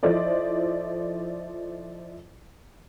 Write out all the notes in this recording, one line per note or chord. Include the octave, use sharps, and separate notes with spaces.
F3 E4 A4 C5 D5 D#5